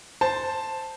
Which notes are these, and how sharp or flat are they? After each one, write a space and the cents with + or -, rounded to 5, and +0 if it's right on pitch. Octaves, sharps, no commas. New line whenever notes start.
C5 +0 A5 +0